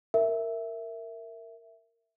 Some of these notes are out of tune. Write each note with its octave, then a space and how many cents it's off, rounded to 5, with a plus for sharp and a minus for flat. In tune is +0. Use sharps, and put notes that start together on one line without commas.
A#4 -15 E5 +0